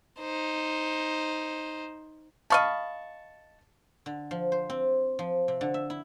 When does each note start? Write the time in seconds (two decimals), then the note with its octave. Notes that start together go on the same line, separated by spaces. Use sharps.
0.20 D#4 C5
2.50 D#5 F5 A5 B5 C#6
4.06 D3
4.31 F3
4.52 C5
4.70 C4
5.19 F3
5.48 C3
5.61 D3
5.74 E5
5.90 E4